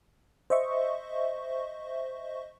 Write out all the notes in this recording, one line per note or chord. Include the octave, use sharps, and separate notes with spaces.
C5 D#5 E5 C#6